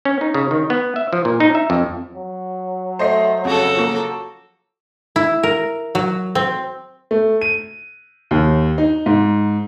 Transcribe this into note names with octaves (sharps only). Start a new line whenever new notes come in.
C#4
D#4
C#3
D#3
B3
E5
F3
A#2
D#4
E5
F2
F#3
A3 C5 D#5 C7
F2 C#3 F#4 A4
F3 A#3
E4
A#4
F#3
C4
A3
D#7
D#2
D#4
G#2